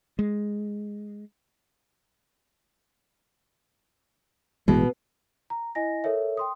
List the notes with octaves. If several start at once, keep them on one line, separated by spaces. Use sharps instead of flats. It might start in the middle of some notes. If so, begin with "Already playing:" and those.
G#3
A1 B2 E3 G#3
A#5
E4 D#5 G#5 A#6
A4 A#4 C#5 E5
G5 C6 D#6